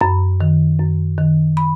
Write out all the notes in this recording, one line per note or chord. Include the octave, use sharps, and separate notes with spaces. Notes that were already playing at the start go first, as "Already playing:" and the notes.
F#2 B5
D#3
F#2
D#3
B5